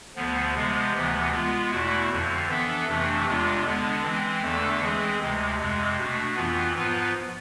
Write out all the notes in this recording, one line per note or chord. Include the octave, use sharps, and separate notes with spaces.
D2 D3 F3 B3
C3 F3 G#3 B3
D2 C3 E3 B3
G#3 B3 F4
E2 B2 A3 E4
F2 D3 F3
E3 B3 D4 A4 E5
F2 C3 E3 A3 D4
E2 C3 G#3 D4 F4
D3 G#3 B3 D4
E3 G#3 C4
E2 D3 A3 D4 A4
E3 G#3 C4 G#4
D2 C3 G#3
F2 C3 G#3
B2 A3 D4
F2 E3 B3 F4
G#2 F3 B3 F4 B4